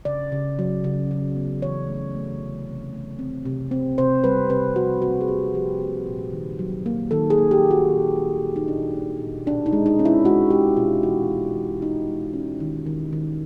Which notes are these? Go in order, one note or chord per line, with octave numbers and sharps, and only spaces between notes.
C#3 D5
C#3
F#3
C#3
C#3
B3
E3 C#5
A3
A3
C3
C3
A3
C4
C3
C4
C3 C5
G3 B4
C3 B4
F3 F#4
A#3 F#4
G#4
A#3 G4
F3 G4
A#3
A#2
D#3
F#3
A#3
D#3 A4
G#4
A#3
G4
A#3
F#4
A#2
G3
A#2
D#4
A#2 D4
A#2
A#2
B2 D4
D#4
G#3
D#4
C#4
E4
G#3 F#4
G#3 G4
B2 F4
E3 F#4
C#4
E3
G#3 D#4
G#3
C#4
D#3
D#3
D#3